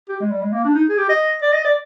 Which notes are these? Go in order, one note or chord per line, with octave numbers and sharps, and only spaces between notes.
G4
G#3
G3
G#3
A#3
D4
D#4
G#4
G4
D#5
D5
D#5
D5